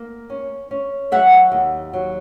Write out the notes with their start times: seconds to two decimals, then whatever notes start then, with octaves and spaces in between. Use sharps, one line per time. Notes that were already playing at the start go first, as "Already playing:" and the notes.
Already playing: A#3
0.30 C#4
0.71 C#4
1.11 F#3 E5 F#5
1.52 D#2
1.93 F#3